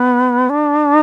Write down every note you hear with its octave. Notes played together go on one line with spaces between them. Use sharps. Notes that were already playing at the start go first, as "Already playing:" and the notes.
Already playing: B3
D4